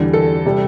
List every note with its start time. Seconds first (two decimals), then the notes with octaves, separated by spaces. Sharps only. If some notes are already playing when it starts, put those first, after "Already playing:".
Already playing: E2 D3 G3
0.14 A4
0.46 C3 G3